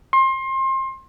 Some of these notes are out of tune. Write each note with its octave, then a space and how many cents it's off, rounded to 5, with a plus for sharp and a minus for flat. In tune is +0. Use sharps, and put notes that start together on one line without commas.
C6 +30